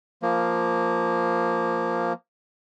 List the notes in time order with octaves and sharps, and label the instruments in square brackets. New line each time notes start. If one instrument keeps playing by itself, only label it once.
[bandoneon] F3 A#3